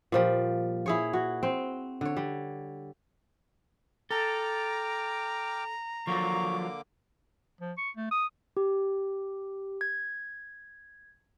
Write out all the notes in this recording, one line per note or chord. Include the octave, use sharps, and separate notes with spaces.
A#2 F3 G3
E4 G#4 C#5
F#4
C4
D3 C#5
G3
A4 G5 A#5 D6 F6
D3 F3 F#3 A#3 C#6 D6
F3
C#6
A3
D#6
G4
G#6